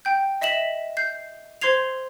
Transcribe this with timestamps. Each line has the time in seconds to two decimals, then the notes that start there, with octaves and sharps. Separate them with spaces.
0.05 G5 G6
0.41 D#5 E5 B6 E7 F#7
0.97 G6 C7
1.61 C5 C6 G#6 C7 F7